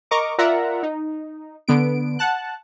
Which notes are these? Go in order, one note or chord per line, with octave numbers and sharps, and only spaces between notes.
A#4 D#5 A#5 C#6 D6
F4 A#4 D5 E5 F#5 A#5
D#4
D3 B3 D7
F#5 A5 F#6